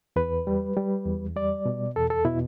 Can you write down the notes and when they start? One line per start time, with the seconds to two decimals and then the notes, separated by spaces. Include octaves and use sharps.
0.16 E2 B4
0.47 G3
0.76 G3
1.06 E2
1.36 G3 D5
1.66 B2
1.96 E2 A4
2.10 A4
2.25 B2 E4